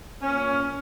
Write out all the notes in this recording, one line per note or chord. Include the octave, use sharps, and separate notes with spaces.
A#2 C#4